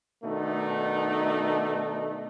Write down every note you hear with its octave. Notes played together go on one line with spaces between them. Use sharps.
B2 D#3 A3 D4 D#4